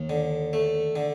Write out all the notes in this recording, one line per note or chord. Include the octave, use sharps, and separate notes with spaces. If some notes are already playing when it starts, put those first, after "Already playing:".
Already playing: D#2
D3
A3
D3